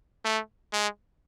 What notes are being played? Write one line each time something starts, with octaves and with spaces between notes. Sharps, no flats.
A3
G#3